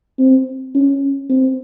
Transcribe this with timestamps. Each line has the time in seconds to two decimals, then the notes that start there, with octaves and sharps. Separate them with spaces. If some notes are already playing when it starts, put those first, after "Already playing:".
0.19 C4
0.75 C#4
1.30 C4